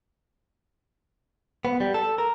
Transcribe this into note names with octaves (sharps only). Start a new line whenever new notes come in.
B3
G3
A4
A#4